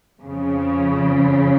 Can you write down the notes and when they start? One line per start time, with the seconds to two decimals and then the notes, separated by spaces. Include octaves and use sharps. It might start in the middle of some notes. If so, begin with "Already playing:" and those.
0.24 F2 C#3 F3